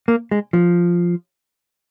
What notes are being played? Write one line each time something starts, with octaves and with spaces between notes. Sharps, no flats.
A#3
G#3
F3